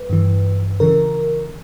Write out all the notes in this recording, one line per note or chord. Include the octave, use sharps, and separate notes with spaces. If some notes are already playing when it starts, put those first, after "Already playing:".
Already playing: B4
G2 E3
C#3 E3 A#4